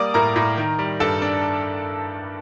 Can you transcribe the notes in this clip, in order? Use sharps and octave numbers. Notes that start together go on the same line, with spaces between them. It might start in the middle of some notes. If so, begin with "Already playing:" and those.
Already playing: G3 A#3 D5 D6 D#6
A2 A#4 A#5
A2
D#3
G3
G2 A4 A5
D4